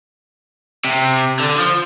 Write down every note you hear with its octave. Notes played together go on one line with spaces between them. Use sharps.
C3
D3
F3